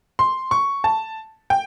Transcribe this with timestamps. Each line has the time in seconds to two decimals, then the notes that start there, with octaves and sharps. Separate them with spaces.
0.19 C6
0.51 C#6
0.84 A5
1.50 G5